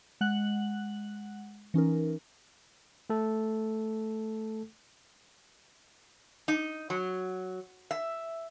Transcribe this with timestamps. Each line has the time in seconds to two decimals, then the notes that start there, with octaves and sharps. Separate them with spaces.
0.21 G#3 F#5 F#6 F#7
1.74 E3 C#4 D#4 A#4
3.10 A3 A4
6.48 D#4
6.90 F#3
7.91 E5